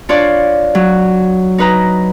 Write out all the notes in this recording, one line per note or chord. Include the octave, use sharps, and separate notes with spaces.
D4 F4 C#5 D5
F#3
D#4 B4 A#5